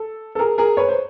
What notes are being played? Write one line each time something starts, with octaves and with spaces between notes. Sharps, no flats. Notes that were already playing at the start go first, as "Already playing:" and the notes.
Already playing: A4
A4
G#4 A#4
G#4 A#4
B4 C#5
C5